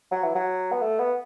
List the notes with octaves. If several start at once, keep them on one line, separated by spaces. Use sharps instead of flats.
F#3
E3
F#3
B3
A3
B3